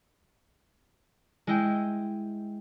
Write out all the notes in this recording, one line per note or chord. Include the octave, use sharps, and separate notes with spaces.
G#3 E4 D#5 G5